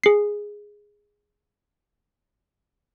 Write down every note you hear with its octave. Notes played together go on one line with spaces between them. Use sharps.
G#4 C7